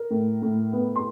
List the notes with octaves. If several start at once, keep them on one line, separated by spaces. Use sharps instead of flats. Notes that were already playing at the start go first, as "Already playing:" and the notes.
Already playing: A#4
A2
A2
B3
C6